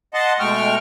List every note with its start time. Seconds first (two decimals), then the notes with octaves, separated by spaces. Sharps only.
0.14 D#5 F#5 A5 C6
0.40 B2 G#3 A3 G5 C#6 F6